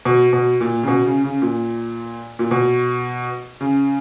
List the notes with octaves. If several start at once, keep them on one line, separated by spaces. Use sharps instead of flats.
B2
B2
A#2
C#3
B2
C#3
C#3
A#2
A#2
B2
C#3